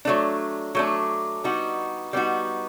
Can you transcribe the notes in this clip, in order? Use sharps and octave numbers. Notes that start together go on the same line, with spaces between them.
F#3 A3 D4
F#3 A3 D4
G3 B3 D#4 F#4
G3 B3 D#4 F#4